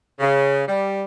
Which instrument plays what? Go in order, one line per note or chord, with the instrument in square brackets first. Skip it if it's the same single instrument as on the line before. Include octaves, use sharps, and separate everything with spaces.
[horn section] C#3
G3